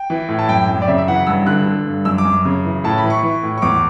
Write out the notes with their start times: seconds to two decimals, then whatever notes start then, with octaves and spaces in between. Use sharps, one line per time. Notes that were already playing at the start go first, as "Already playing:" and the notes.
Already playing: G5
0.10 E3
0.28 A2
0.39 A5
0.48 F#2 G5
0.69 F#2
0.82 D5
0.88 C#3 E5
0.98 E5
1.08 E3 F#5
1.27 G2 E6
1.46 D3 F#6
1.66 D3
1.87 G2
2.05 F#2 E6
2.18 D6
2.25 F#2
2.45 C#3
2.65 E3
2.84 A2 A5
2.98 B5
3.04 E3
3.10 C#6
3.23 E3
3.43 A2
3.58 C#6
3.62 E2 D6